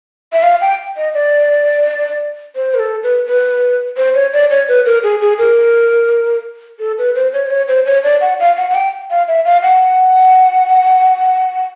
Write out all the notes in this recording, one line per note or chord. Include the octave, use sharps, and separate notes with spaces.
E5
F5
G5
D#5
D5
C5
A#4
A4
B4
B4
C5
C#5
D5
C#5
B4
A#4
G#4
G#4
A#4
A4
B4
C5
C#5
C5
C#5
C5
C#5
D5
F#5
F5
F#5
F#5
G5
F5
E5
F5
F#5